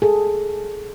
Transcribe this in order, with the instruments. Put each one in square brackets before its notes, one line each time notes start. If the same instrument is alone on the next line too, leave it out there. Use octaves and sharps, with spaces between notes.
[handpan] G#4 A4